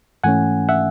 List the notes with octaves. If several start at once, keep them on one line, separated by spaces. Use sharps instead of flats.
G#2 E3 A3 C#4 F#5 G#5
E5 F#5